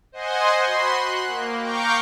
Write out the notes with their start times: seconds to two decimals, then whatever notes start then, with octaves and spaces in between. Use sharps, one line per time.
0.12 C5 D#5 F#5 G#5 C6
0.65 F#4 B5 C6
0.95 F#6
1.27 A#3
1.60 F5 G5 A#5 C#6 D6 G6